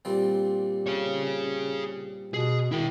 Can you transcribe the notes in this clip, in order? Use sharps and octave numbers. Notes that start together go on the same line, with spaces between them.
A#2 G3 C4
G#4 C#5
B2 G#4
D#3 E4 G5